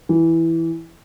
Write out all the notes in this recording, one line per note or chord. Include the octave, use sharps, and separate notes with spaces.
E3